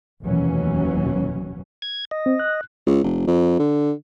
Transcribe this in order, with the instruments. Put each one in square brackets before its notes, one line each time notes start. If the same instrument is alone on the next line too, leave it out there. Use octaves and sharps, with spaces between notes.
[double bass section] F1 D#2 B2 E3 F#3 C#4
[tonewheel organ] G#6
D#5
[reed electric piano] C4
F#6
[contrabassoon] C#2
F1
F2
D3